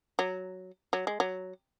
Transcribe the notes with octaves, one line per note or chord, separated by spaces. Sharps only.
F#3
F#3
G#3
F#3